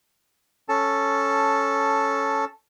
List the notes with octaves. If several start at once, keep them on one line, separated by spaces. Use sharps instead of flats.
C#4 A4 A5